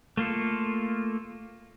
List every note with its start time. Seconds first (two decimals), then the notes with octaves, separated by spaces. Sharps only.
0.17 A3 A#3 F4 A4